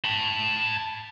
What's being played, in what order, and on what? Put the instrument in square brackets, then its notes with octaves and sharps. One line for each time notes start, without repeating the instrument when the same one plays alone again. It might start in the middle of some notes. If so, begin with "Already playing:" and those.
[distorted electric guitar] A5 B5